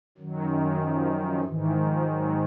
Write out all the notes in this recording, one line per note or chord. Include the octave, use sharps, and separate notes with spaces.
F#2 D#3 F#3
F#3
F3
F3
G#2 D#3 E3
F3
F#3